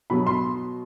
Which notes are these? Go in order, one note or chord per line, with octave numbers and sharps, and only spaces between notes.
B2 F#3 B3 B5
C6